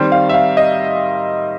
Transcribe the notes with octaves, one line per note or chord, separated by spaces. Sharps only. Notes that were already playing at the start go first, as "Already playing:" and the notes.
Already playing: D#3 G3 C4
F5
E5
F5
D#5